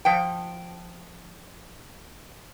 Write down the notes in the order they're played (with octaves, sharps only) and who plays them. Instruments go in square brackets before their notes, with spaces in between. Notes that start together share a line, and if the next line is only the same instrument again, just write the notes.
[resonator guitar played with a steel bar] F3 G5